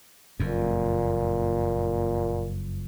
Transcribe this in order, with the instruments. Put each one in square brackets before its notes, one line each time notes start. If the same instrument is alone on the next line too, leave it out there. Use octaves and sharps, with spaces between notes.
[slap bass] F#1 F2 [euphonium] A#2